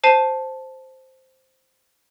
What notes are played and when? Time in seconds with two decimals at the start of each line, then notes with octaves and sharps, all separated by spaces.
0.04 C5 A5 C7 D#7